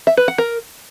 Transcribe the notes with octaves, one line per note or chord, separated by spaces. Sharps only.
E5
B4
F#5
A#4